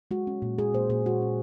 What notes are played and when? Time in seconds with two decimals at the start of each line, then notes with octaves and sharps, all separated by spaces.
0.11 G#3 F#4
0.27 C#4
0.42 A#2
0.58 G#3 G#4
0.74 A#2 C5
0.90 A#2 G#4
1.05 G#3 F#4
1.22 C#4